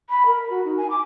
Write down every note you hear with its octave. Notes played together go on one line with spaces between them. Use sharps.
B5
A#4
F#4
D#4
G#5
D6